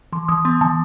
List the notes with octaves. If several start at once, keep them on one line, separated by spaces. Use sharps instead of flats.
E3 C6
E3 D#6
B3 C6
E3 A5